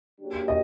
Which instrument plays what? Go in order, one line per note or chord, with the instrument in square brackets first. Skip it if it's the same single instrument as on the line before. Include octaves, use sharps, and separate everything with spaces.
[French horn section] C#3 F#3 A#3 D4 G4
[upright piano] D#5